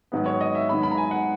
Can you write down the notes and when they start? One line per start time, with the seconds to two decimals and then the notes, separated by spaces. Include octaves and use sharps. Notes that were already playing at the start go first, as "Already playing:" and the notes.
0.12 G#2 D#3 F#3 B3
0.26 C#5
0.41 D#5
0.55 E5
0.69 G#2 D#3 F#3 B3 B5
0.83 B5
0.91 A#5
0.97 G#5
1.11 F#5